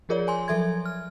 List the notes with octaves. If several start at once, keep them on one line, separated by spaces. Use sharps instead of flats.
F3 F4 G#4 A#4 C#5 D5
C#5 G#5 C6
F3 F#3 A4 E5 C6 G#6
F6